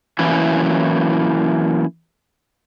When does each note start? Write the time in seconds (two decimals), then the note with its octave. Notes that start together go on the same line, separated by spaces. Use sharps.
0.19 E3 F#3 A#3 C#4 E4